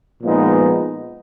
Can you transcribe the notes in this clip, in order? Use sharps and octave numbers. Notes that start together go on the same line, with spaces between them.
A#2 F3 G#3 B3 D#4